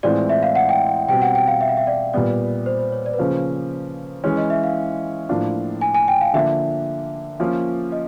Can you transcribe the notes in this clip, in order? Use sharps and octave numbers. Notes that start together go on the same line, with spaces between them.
A2 E3 G#3 C4 F4 D5
E5
F5
F#5
G5
B2 G3 C4 G5
F#5
G5
F5
E5
F5
E5
D5
A#2 G3 B3 D5
C5
C5
C#5
D5
B4
C#3 F3 A#3 C#4 C5
E3 G#3 C#4 C#5
D#5
E5
F5
A2 F3 A#3 D4 F4
G#5
G#5
G5
F5
D3 F3 A#3 E5
F3 A#3 C#4 F4
D#5